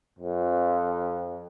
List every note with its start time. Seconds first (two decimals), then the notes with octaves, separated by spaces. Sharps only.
0.19 F2